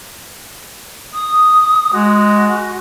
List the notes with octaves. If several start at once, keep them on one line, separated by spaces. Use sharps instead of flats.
D#6
G#3 F#4